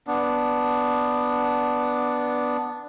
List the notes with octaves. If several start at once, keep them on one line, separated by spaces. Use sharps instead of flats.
B3 D4